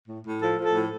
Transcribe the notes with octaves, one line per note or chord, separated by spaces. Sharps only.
A2
A2
F3 A4
F3 A4
A2